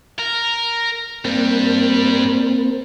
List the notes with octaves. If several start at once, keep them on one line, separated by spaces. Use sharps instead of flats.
A#4
G2 G3 A#3 C4